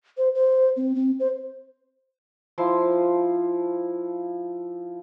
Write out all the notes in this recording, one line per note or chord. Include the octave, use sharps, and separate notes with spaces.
C5
C5
C4
C4
C5
F3 E4 A5 C6